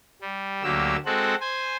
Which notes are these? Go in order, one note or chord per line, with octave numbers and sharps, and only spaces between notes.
G3
D2 F#3 A#3 G4 E6
G#3 C4 F#4 A4 F#5
C5 G#5